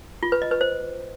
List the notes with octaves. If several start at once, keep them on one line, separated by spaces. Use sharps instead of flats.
F4
B4
D#5
B4
C5